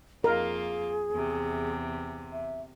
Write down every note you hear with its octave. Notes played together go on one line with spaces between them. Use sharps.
F2 A#3 F4 G#4 A#4
E2 C3
E5